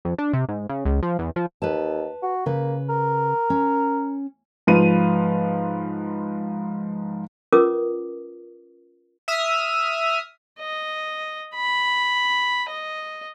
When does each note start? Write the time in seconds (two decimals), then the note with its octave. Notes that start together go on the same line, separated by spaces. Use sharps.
0.05 F2
0.18 D4
0.33 C3
0.49 G#2
0.69 C#3
0.85 C#2
1.03 F3
1.19 E2
1.36 F3
1.62 D#2 B4 A5
2.22 F#4
2.46 C#3 A#3 B4
2.89 A#4
3.50 C#4
4.67 G#2 F3 B4 F5 D#7
7.53 C#4 F4 A#4 B4 D6 D#6
9.28 E5 D#6 F6
10.59 D#5
11.55 B5
12.69 D#5